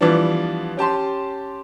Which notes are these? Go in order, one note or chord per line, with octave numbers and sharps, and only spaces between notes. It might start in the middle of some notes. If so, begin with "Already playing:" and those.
E3 F3 G3 B3 D4
C#4 G4 A5 C6